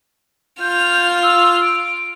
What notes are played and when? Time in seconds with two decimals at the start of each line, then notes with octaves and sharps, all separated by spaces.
0.61 F4 F6 G6
1.23 E6
1.63 D7